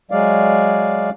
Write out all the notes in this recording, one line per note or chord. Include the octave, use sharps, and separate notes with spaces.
F#3 G#3 D5 F5